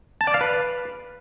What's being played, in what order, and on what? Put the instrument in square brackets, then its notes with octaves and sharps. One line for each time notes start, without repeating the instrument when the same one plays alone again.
[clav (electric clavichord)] A5
D5
F5
B4